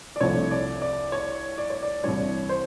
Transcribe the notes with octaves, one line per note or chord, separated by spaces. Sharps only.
D5
C2 C3 F3 A3 C#5
D5
D5
C#5
D5
C#5
D5
C2 C3 E3 G3 C#5
C5